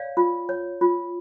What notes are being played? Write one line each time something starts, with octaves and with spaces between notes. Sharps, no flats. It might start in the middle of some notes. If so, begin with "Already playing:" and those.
Already playing: C#5 D5 F5
F4
C#5
F4